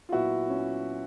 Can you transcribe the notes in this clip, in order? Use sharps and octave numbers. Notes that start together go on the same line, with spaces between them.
F4
A#2 F#3 B3 E4 F#4
C#4